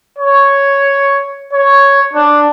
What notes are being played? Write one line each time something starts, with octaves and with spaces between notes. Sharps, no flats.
C#5
C#5
D4